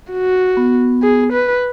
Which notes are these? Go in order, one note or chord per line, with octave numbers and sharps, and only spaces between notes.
F#4
B3
G#4
B4